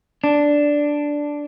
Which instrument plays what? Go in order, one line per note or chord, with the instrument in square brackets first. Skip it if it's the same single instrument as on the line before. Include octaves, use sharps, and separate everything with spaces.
[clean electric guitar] D4